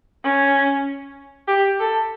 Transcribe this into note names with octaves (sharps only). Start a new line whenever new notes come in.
C#4
G4
A4